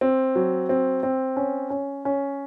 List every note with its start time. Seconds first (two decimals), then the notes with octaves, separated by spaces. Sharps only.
0.01 C4
0.35 F#3
0.69 C4
1.03 C4
1.37 C#4
1.70 C#4
2.05 C#4